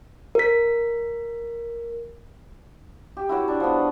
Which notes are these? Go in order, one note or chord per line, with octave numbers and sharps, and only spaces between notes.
A#4 B6
G4
E4 F#4 C#5
D4
F3 B3